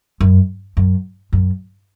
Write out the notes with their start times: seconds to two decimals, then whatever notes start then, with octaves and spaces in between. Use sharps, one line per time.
0.20 F#2
0.77 F#2
1.33 F#2